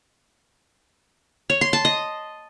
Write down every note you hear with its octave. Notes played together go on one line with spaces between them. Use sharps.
C#5
C6
A5
D#5